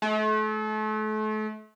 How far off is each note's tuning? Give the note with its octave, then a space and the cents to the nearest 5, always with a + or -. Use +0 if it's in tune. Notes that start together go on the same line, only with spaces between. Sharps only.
A3 -35